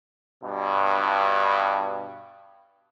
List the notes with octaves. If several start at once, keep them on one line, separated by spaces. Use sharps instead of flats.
G2 B2